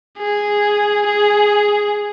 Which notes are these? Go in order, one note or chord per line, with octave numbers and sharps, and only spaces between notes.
G#4
G#4